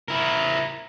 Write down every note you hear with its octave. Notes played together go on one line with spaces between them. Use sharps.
E4 A#4